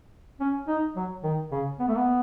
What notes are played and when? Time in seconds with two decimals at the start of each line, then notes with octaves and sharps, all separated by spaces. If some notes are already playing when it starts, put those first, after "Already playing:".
0.40 C#4
0.68 D#4
0.96 F#3
1.24 D#3
1.52 C#3
1.79 B3
1.88 A3
1.97 B3